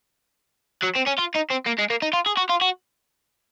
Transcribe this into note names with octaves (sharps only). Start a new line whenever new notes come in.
F#3
C4
C#4
F4
D#4
C4
A#3
G#3
A#3
D#4
F4
G#4
F#4
F4
F#4